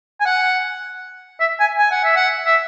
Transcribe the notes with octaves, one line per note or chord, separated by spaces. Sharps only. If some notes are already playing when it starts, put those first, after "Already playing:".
G#5
F#5
E5
G#5
G#5
F#5
E5
F#5
E5